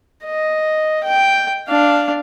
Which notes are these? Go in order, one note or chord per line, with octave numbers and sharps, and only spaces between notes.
D#5
G5
D4 F5